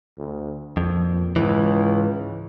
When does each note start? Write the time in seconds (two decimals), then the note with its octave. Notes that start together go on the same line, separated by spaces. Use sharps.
0.18 D2
0.77 F2 A#2
1.36 C#2 G#2 E3